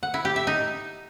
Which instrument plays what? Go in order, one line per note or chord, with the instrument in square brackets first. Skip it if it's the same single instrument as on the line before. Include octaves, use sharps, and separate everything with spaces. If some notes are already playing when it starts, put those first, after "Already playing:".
[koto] F#5
E4
G4
E5
D#4